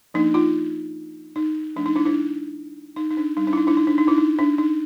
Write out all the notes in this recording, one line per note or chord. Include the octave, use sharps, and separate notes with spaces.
F3 A#3 D4 D#4
D#4 F4
D#4
F3 A3 D4
D#4
D4 E4
D4 E4
D#4
D#4
D4
G3 C4 D#4
D4
E4
D#4
D4 E4
D#4
D4
D#4
D4 E4
D#4
D4
D#4